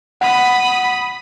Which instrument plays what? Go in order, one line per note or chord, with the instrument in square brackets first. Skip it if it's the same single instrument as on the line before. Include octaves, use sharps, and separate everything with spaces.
[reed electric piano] F#5 [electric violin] B5 D#6